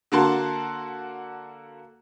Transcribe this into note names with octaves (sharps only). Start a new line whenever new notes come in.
D3 A#3 F#4 A5 C6